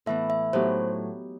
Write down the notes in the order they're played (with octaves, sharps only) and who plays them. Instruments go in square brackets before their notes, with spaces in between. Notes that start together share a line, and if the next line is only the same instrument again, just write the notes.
[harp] A2 E3 B3 [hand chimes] E5
[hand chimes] E5
[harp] A2 F#3 B3 D#4 G4 [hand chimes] C5